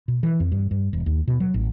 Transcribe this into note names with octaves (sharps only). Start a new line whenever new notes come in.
B2
E3
F2
G2
G2
E1
D#2
B2
F#3
A1